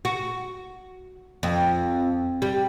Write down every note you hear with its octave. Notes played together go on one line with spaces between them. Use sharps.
F#4
F2
G3